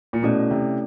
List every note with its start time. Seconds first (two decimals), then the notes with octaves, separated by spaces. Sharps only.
0.13 A#2
0.22 B2 A3 C#4 E4 A4 D5
0.51 C3